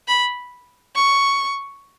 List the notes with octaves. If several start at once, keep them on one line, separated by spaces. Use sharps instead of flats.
B5
C#6